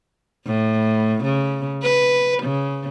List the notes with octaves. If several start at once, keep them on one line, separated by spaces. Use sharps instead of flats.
A2
C#3
B4
C#3